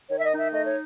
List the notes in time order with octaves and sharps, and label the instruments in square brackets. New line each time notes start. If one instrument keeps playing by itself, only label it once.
[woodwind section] D#3 C#5
E5
D#5
D#4
E5
A3 D#5
C#5